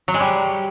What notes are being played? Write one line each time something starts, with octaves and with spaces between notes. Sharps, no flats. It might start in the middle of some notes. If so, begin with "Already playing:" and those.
F#3
G#3
G3